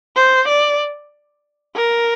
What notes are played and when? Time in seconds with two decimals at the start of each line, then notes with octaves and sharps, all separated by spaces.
0.16 C5
0.48 D5
1.76 A#4